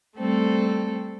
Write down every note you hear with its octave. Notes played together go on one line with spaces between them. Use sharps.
G3 A3 C4 A4